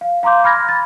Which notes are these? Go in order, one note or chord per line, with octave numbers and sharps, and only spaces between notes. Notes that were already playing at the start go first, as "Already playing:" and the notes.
F5
F5 A#5 C6 D6 G6
B5 F6 G#6 A#6
A6